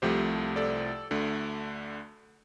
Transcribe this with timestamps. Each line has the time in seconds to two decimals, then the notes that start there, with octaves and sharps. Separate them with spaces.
0.02 C2 C3 F3 A3 G4 C5
0.56 A4 D5
1.11 D2 D3 A3